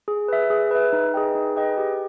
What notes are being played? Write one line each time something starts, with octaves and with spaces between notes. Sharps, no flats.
G#4
B4 E5
G#4
B4 E5
D#4
G#4 B4 D#5 G5
D#4
G#4 B4 D#5 G5
G4